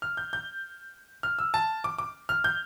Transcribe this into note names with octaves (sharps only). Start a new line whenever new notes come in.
F6
G6
G6
F6
E6
A5
D6
D6
F6
G6